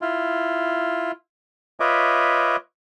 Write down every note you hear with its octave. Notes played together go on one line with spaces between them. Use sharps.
E4 F4
F4 B4 C#5 D#5 E5 D6